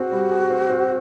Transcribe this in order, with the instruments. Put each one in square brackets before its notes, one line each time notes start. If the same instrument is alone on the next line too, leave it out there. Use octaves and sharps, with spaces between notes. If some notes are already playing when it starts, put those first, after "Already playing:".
Already playing: [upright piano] C4 G#4 [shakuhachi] F#4
[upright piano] G3
G#4
C4
C4